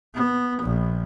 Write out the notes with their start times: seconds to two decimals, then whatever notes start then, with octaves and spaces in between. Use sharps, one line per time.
0.15 B3
0.63 A#1